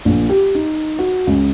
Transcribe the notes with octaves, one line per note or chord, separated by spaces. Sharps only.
A#1
G4
D#4
F#4
C#2